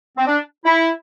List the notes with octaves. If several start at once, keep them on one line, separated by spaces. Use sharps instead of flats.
C4
D4
E4